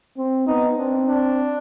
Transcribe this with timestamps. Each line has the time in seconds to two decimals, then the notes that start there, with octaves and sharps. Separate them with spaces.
0.17 C4
0.47 B3 D#4
0.77 C4 D4
1.08 D4